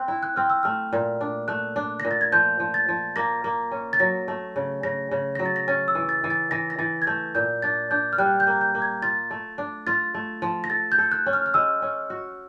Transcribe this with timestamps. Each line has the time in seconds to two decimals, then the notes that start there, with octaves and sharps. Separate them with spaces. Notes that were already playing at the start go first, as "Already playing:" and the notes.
Already playing: C4 F#6
0.08 E4
0.23 F#6
0.36 C4 F6
0.50 E6
0.63 A3 F6
0.93 A#2
1.21 D4
1.48 A3 F#6
1.76 D4
2.00 A#6
2.05 A#2
2.11 A6
2.21 G#6
2.32 F3 G6
2.60 F3
2.74 A6
2.89 F3
3.16 A#3 A#6
3.44 A#3
3.71 C#4
3.93 A6
4.00 F#3 A#6
4.28 A3
4.56 C#3
4.83 C#3 A#6
5.11 C#3
5.35 F#3 A#6
5.46 A6
5.56 A#6
5.68 C#4 A6
5.88 E6
5.95 E3
6.09 A6
6.24 E3
6.30 A6
6.51 E3 A#6
6.70 A#6
6.79 E3 A6
7.02 G#6
7.07 A3 G6
7.35 A#2 G6
7.62 D4 A6
7.91 D4 G6
8.13 F6
8.18 G3 F#6
8.40 G6
8.47 A#3
8.61 G6
8.75 A#3
8.82 G#6
9.02 F4 A6
9.31 A3
9.58 D4
9.87 F4 A6
10.14 A3
10.42 F3
10.64 A#6
10.70 A4 A6
10.92 G6
10.98 A4
11.12 F#6
11.26 C#4
11.33 F6
11.46 F6
11.54 G#3 E6
11.82 C#4
12.10 F#4